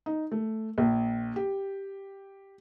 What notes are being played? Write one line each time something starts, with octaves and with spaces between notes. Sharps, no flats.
D#4
A3
A#1
G4